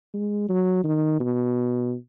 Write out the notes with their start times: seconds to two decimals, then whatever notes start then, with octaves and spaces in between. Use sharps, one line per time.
0.14 G#3
0.49 F#3
0.84 D#3
1.20 B2